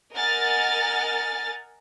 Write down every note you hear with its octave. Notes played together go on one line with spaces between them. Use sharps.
A#4 D#5 F#5 G#5 F6 A6